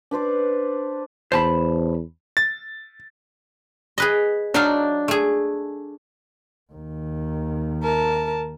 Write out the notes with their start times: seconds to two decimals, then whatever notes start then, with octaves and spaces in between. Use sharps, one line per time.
0.11 D4 B4 C5 D5
1.32 E2 C5 A5 B5
2.37 A6
3.98 G#4 B4 D#5
4.54 F#3 D4 D#4 F5
5.08 A3 G#4
6.73 D#2 D#3
7.83 A#4 A5